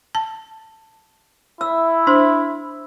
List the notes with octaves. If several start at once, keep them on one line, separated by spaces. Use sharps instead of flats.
A5
E4 E5 E6
D4 C5 C6